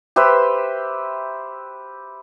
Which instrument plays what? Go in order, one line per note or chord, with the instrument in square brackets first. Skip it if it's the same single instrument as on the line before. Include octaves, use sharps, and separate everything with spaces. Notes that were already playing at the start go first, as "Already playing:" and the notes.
[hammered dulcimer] G4 B4 C5 E5